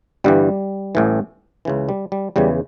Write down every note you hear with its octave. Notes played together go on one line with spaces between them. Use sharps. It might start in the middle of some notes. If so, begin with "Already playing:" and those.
G1 G2 E3 G3
A1 A2 E3
C#2 C#3 E3
G3
G3
E2 C#3 E3 G3